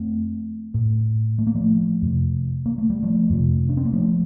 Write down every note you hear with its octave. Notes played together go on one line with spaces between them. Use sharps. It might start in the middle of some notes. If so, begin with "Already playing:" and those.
Already playing: F2 A3 C4
A2
A3
A#3
F3 A3
F2 C3
A#3
A3
G3
F3 A3
F2 C3
D4
C4
A#3
F3 A3